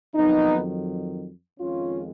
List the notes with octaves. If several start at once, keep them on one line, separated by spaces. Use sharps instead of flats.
F2 D#3 F#3 B3 D#4
F2 D#3 G#3 C#4 F4